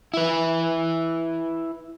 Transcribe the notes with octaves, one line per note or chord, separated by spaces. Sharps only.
E4 B4